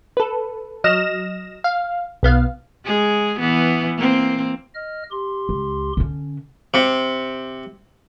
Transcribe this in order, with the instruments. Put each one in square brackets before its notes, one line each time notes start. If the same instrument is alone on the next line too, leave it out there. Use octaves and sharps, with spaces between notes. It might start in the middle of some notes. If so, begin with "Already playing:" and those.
[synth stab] A4 B4
F#3 D#5 F6 A#6 E7
F5
B1 B3 F5
[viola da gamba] G#3 G#4
E3 B3
A#3 C4
[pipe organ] D#5 F6
G4 C6
[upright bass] C#2
D3 C#4
[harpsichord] C3